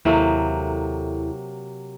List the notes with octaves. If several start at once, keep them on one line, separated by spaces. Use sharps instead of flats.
D#2 C3 F#3 A#3 E4 A4